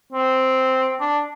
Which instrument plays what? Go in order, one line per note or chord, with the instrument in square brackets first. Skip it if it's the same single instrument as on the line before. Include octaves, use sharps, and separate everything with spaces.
[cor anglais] C4
D4